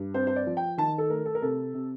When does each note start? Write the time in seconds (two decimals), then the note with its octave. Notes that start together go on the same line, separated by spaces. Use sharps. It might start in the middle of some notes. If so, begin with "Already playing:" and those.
Already playing: G2
0.14 C4 C5
0.27 C5
0.36 D5
0.47 F3
0.57 G5
0.78 D#3 A5
0.98 A4
1.10 A3 A#4
1.26 A4
1.35 A#4
1.42 C3 A4
1.74 C3